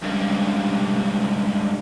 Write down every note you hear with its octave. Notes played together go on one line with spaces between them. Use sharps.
C#2 G2